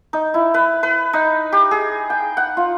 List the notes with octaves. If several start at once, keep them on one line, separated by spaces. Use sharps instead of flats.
D#4
E4
B4
B4
D#4
G4
G#4
G5
F#5
F4